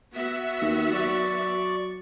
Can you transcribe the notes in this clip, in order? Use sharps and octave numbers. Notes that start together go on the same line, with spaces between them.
B3 F#4 E5
D#2
F#3 D5 C#6